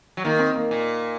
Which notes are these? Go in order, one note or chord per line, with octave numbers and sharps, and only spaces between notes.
F#3
D#3 A#3
C4
A#3
A#2